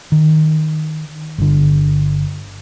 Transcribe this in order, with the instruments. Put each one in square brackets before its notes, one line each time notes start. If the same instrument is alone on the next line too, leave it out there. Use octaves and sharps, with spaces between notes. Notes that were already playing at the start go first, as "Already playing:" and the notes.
[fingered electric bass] D#3
G1 D3